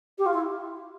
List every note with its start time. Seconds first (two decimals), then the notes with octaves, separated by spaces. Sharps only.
0.18 G4
0.26 F4
0.33 E4